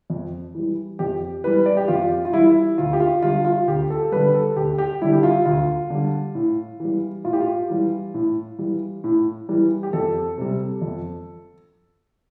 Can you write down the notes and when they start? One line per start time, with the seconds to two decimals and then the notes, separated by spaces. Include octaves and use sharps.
0.10 F2
0.55 E3 G3
0.99 F2 G4
1.44 E3 G3 B4
1.66 D5
1.77 G4
1.88 F2 F4
2.25 F4
2.33 E3 G3 E4
2.78 D2 F4
2.93 G4
3.00 F4
3.23 D3 G3 F4
3.45 F4
3.68 D2 G4
3.90 A4
4.12 D3 G3 B4
4.34 A4
4.56 D2 G4
4.78 G4
5.02 D3 G3 E4
5.13 G4
5.23 F4
5.46 D2 F4
5.90 D3 G3
6.35 A2
6.80 E3 G3
7.24 A2 F4
7.33 G4
7.40 F4
7.70 E3 G3
8.14 A2
8.59 E3 G3
9.04 A2
9.49 E3 G3
9.83 G4
9.93 F2 A4
10.38 C3 G3
10.81 F2